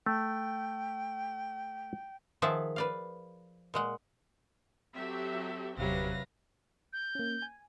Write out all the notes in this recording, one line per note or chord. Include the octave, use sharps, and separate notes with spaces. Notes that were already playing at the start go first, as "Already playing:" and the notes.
A3 G5
D#3 F3 G#4 E5 F#5 A5
B4 D5 F5
A#2 G#3 F#5
F#3 C4 G4 A4 E5
G1 E2 C3 F#3 G4 B4 F5 A#6
G6
A#3 C#4
G#5